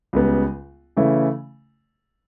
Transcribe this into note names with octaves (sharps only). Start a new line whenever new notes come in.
C#2 C#3 G3 B3
C#3 E3 A3 C#4 E4